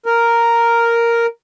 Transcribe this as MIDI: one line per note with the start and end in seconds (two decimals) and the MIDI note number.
0.06 1.26 70